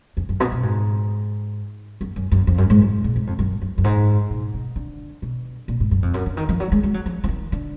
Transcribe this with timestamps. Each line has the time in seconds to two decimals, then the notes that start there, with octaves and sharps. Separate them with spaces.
0.17 F2
0.29 F#2
0.40 B2
0.52 B2
0.63 G#2
2.01 F#2
2.16 F#2
2.32 F#2
2.47 F2
2.58 F#2
2.70 G#2
2.82 F#3
2.93 A#2
3.04 A#2
3.16 G#2
3.27 F2
3.39 F#2
3.62 F#2
3.78 F#2
3.84 G#2
4.30 A#2
4.54 B2
4.76 D3
5.22 B2
5.68 A#2
5.80 G#2
5.91 F#2
6.02 F2
6.14 F#2
6.26 D3
6.37 D#3
6.49 F3
6.60 F#3
6.72 G#3
6.83 G#3
6.94 F#3
7.06 F3
7.24 F3
7.29 D#3
7.52 D3